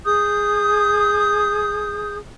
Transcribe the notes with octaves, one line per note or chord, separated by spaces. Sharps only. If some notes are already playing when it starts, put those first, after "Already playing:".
G#4 D#6 G6